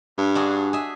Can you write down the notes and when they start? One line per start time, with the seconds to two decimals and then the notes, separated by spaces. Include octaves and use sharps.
0.18 G2
0.35 D4 F#4 G#4
0.73 G#4 E5